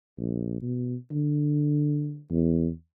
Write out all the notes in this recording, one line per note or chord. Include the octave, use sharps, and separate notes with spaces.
A#1
B2
D3
E2